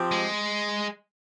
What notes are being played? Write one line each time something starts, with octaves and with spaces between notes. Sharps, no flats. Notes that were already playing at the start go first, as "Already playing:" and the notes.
Already playing: F3 C4 G4
G#3